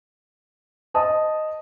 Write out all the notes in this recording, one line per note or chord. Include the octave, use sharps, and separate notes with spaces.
C5 D#5 A5 D#6